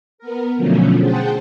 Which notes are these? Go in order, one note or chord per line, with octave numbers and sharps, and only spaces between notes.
B3 A#4
B2 D3 F3 F#3 A3 C#4
G#4 C5 F#5 G5 A5